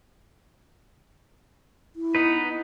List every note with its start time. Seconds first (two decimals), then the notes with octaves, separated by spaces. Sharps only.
1.96 E4
2.15 B3 D#4 B4